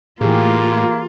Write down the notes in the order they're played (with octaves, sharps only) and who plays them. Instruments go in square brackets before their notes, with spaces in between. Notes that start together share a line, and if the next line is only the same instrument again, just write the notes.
[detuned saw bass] A2 [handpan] E3 G4 G#4 [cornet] A#3 [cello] F4